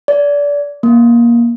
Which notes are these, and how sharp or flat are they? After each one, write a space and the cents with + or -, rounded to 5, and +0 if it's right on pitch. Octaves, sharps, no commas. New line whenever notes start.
D5 -25
A#3 +20